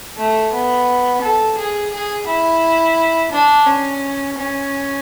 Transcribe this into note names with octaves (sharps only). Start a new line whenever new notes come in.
A3
B3
A4
G#4
G#4
E4
D4
C#4
C#4